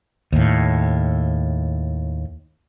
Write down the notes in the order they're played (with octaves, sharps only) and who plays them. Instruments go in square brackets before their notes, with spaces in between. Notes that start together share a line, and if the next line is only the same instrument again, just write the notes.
[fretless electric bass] D#2 A2